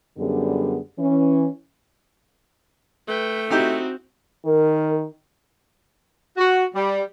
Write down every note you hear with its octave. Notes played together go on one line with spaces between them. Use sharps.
F#2 D3 G3 B3 G#4
E3 C#4
A3 B4 G5
C4 D#4 E4 F#4 G4
D#3 A#4
F#4
G3